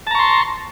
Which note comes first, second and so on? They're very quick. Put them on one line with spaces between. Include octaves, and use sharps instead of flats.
A5 A#5 C#6 C6